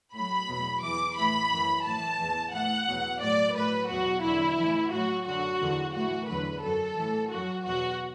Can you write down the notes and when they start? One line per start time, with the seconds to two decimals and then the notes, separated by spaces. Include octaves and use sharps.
0.14 A2 F#3 B5
0.48 E2 B2 F#3
0.82 E2 E3 D6
1.17 A2 E3 B5
1.51 F#2 E3
1.85 A2 E3 A5
2.19 E2 E3
2.53 A2 E3 F#5
2.88 E2 B2 F#3
3.21 A2 F#3 D5
3.55 A2 F#3 B4
3.89 E2 B2 F#3 F#4
4.23 E2 D3 F#3 E4
4.58 A2 E3
4.92 A2 F#3 F#4
5.26 F#2 D3 F#3 F#4
5.61 E2 D3 F#3
5.94 A2 E3 F#4
6.28 E2 D3 F#3 B4
6.63 F#2 F#3 A4
6.97 A2 E3
7.31 F#2 F#3 F#4
7.65 E2 B2 F#3 F#4